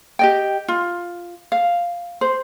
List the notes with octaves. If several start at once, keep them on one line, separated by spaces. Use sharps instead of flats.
G4 D#5 G5
F4
F5
C5